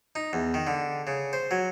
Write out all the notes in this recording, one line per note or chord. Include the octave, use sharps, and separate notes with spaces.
D#4
E2
D#3
D3
C#3
C5
F#3